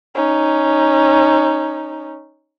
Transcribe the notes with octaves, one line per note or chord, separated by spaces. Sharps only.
C#4 D#4